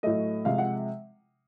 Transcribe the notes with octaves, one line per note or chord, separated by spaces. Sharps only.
A2 F#3 A3 D#5
C3 F3 G#3 F5
F#5